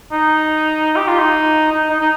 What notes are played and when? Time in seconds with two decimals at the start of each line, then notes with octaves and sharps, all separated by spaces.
0.12 D#4
0.96 G4
1.08 F4
1.19 D#4
1.72 D#4
1.90 D#4
2.01 D#4